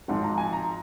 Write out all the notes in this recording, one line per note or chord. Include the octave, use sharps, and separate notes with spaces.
G#1 G#2 F3 G#3 F#5
A#5
G#5
A#5